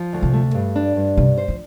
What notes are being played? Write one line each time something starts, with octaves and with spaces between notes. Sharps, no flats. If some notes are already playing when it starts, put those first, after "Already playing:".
Already playing: F3
D2
C3
A3
G2
D4
G2
C3 G3
C5
F3